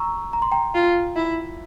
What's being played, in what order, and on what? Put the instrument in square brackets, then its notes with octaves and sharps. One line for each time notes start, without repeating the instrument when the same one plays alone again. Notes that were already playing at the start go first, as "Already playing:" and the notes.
Already playing: [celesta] A#5 C#6 E6
A#5
C6
G5 A#5
[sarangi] F4
E4